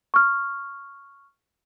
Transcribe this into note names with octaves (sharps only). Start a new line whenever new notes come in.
C#6 F6